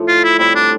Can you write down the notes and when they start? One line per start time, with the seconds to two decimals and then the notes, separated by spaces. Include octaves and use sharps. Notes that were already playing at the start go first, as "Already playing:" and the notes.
Already playing: A2 F3 A3
0.08 F4
0.24 E4
0.38 A2 G3 C4 E4
0.55 D4